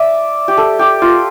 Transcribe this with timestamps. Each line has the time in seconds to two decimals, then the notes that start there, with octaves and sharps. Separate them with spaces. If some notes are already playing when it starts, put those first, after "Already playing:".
Already playing: D5 E5
0.48 G4
0.57 A4
0.79 G4
1.02 F4